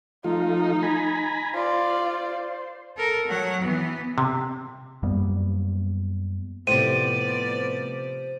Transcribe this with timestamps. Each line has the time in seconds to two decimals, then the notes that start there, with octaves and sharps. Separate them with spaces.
0.24 F3 A3 D#4 F4
0.83 G#5 A#5 B5
1.54 F4 C5 D5
2.97 A4 A#4
3.27 F#3 F#5
3.63 E3 B3
4.18 C3
5.03 F#2 G3 A#3 B3
6.67 A2 C3 F3 B3 C5 D5 D#7